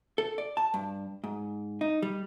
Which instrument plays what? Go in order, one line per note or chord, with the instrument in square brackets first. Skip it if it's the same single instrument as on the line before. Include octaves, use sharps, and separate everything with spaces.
[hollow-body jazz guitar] A4
D5
A5
G2
G#2
D#4
G3